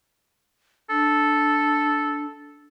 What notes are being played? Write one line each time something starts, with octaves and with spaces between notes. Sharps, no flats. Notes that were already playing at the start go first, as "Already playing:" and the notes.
D4 A4